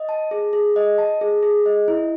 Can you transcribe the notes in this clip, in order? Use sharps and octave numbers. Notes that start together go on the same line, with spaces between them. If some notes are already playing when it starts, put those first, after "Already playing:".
Already playing: D#5
A5
G#4
G#4
D#5
A5
G#4
G#4
D#5
E4